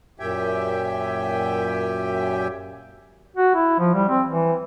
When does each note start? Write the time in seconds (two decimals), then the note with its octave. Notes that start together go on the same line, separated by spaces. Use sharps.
0.20 F#2 A#2 G4 E5 G5 G#5
3.36 F#4
3.55 E4
3.79 F3
3.94 G3
4.09 C4
4.28 E3